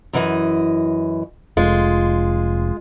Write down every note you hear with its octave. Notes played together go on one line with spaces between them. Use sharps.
F#2 E3 D#5
F1 G#3 F4